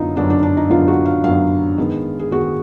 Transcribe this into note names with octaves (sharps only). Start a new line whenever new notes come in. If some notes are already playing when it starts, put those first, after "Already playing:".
Already playing: F#2 D3 F#3 B3 D#4 F4
F#2 D3 F#3 B3 D4
D4
D4
D#4
F#2 D3 F#3 B3 F4
F#4
F5
F#2 D3 F#3 B3 F5
G#2 D#3 G#3 B3
G#4
G#2 D#3 G#3 B3 F#4